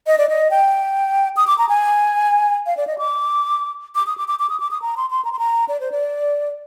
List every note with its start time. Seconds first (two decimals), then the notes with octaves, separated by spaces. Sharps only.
0.07 D#5
0.18 D5
0.29 D#5
0.51 G5
1.37 D#6
1.47 D6
1.58 A#5
1.69 G#5
2.66 F5
2.77 D5
2.87 D#5
2.98 D6
3.95 D6
4.07 D#6
4.18 D6
4.28 D6
4.39 D6
4.50 D#6
4.60 D6
4.71 D#6
4.82 A#5
4.97 C6
5.10 C6
5.25 A#5
5.32 C6
5.39 A#5
5.69 D5
5.80 C5
5.92 D5